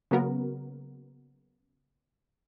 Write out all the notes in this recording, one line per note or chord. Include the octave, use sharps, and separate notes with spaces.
C#3 F#3 A#3 B3 F#4 A#4